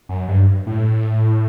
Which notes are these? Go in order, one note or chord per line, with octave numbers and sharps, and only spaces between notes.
F#2
G2
A2